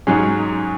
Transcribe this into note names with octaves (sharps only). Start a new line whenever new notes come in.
G#2 F#3 C#4 G#4